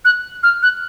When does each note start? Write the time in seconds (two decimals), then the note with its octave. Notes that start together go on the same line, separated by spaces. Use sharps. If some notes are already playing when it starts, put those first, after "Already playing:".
0.05 F#6
0.43 F6
0.63 F#6